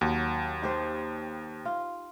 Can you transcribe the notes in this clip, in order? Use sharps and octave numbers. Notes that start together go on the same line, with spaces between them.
D#2 F#3
D#4 G4 C5
F4